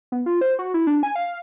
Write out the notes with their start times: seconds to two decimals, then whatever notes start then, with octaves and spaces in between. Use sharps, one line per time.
0.12 B3
0.26 F4
0.41 C5
0.59 F#4
0.74 E4
0.87 D4
1.03 G#5
1.16 F5